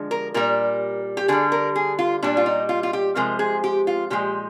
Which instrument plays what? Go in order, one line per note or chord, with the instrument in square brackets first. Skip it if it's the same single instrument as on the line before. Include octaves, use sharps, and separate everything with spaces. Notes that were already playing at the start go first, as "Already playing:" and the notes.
Already playing: [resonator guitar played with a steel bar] D3 F3 G#3
A#4
A#2 G3 A#4
G4
D3 G3 G#4
A#4
G#4
F4
A#2 G3 D4
F4
D#4
F4
F4
G4
C3 F3 G#3 A#4
G#4
G4
F4
A#2 F3 G#3 G4